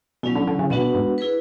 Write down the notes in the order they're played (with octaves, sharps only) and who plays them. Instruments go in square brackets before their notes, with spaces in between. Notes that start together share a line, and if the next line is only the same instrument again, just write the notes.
[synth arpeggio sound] B2 [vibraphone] F#3 C#4 E4
[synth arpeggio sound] D3
D3
C#3
[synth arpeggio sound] B2 [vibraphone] B3 D4 F#4 B4 F#5
[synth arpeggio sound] G#2
[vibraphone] E4 G#4 B4